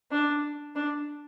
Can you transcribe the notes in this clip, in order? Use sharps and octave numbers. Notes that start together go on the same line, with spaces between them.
D4
D4